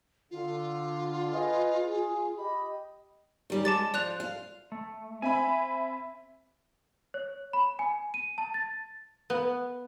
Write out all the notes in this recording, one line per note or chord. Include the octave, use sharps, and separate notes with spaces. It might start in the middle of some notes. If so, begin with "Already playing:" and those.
D3 F4
G#4 B4 D#5
G#4
G4 D#5 B5
D#3 G3 C#4
G#3 A5 D6 A6
F3 D5 F#6 F7
F5
A3
C4 E5 G#5 B5
C#5
B5
G#5
D#7
A5
A6
B3